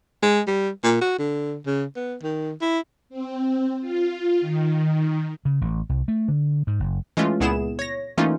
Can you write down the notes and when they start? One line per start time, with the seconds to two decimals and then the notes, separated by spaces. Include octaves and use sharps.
0.23 G#3
0.47 G3
0.84 A#2
1.01 F#4
1.19 D3
1.66 C#3
1.96 B3
2.23 D#3
2.62 E4
3.09 C4
3.81 F4
4.41 D#3
5.45 C#3
5.61 A1
5.89 C2
6.08 A3
6.28 D3
6.67 G#2
6.80 F#1
7.17 E3 G#3 A3 C#4 F4
7.40 C#2 A#2 B3 E4 G#4 E7
7.79 C#5 A#6
8.18 E3 A3 A#3 C#4 D#4 F4